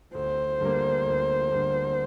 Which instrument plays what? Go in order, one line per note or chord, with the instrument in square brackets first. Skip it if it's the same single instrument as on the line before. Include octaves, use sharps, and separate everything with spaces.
[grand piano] D2 [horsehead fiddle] C5
[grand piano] D3 G3 A#3
D2
D3 G3 A#3